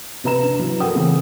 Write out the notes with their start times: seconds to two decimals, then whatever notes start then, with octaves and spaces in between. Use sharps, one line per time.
0.24 C3 B4 A#5 E7
0.43 D4
0.59 F#3 E4
0.80 A4 A#4 F#5 G5 D#6
0.95 C#3 E3 A3 C4 C#4